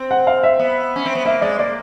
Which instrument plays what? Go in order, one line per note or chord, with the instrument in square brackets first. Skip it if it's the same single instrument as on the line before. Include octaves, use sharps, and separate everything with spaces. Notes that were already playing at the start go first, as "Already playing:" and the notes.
Already playing: [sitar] C4
[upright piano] F#5
F5
E5
[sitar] B3
C#4
C4
B3
[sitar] A#3 [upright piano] E5
[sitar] G#3 [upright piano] D5
[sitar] A#3 [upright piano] D5